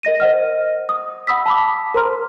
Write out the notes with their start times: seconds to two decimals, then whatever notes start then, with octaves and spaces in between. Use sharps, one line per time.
0.03 A#4 D#5 A#6 D#7
0.20 C5 D#5 F#5 F6
0.89 D#6
1.27 F#5 B5 D#6 E6 B6
1.46 A5 B5 D6
1.94 A#4 C5 A#5 C6 F6